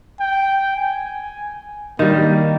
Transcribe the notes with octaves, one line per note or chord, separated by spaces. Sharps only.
G5
G#5
D#3 G3 A#3